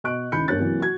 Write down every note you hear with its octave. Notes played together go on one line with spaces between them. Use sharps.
B2 D#5 C#6 F#6 D7
C#2 D#3 E4 B5 G6 C#7
G1 A#3 D4 C#5 F#6 A6
C3 E3 F#3 A#3
F#4 G#6